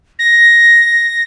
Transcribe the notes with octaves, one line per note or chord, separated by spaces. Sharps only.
A#6